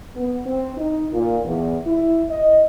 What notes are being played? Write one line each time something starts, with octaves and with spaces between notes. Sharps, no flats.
B3
C4
D#4
A#2
E2
E4
D#5